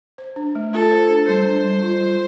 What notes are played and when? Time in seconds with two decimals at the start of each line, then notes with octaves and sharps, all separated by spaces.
0.18 C5
0.36 D4
0.55 A3
0.73 F4 A4
0.91 C5
1.09 D4
1.27 G3 C5
1.45 D4
1.64 G3
1.82 F4
2.00 G3